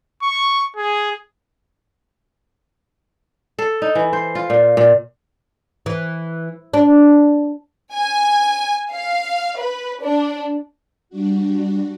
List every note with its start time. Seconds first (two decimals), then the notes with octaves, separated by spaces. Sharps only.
0.22 C#6
0.76 G#4
3.59 A4
3.82 D#4
3.95 E3
4.13 C5
4.35 F4
4.50 A#2
4.77 A#2
5.86 E3
6.74 D4
7.92 G#5
8.91 F5
9.57 B4
10.01 D4
11.09 G3 D4 F#4